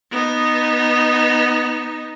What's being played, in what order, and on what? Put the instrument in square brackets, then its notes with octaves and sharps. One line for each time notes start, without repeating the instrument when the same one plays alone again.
[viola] B3 D#4